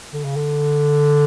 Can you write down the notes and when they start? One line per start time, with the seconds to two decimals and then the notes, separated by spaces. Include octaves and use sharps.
0.13 D3
0.24 C#3
0.36 D3